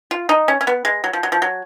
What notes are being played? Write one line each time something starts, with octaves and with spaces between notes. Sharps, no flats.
F4
D#4
C#4
C#4
B3
G#3
F#3
F3
F#3
F3
F#3